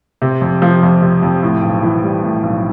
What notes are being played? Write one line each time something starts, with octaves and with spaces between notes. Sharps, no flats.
C3
F2
F3
F2
C3
F2
A2
B1
E3
G3
A2
B1